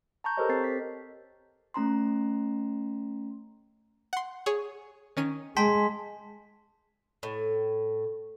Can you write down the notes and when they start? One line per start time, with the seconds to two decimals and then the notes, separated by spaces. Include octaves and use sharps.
0.24 A5 A#5 C#6 G6
0.37 G4 A4 A#4 C5 C#5 D#5
0.49 C4 A6 C7
0.64 B6
1.74 A3 C#4 A#5 C6
4.13 F#5 C6
4.46 G#4 C#5
5.17 D#3 C#4 D#7
5.57 G#3 G5 A5 C6 B6
7.23 A2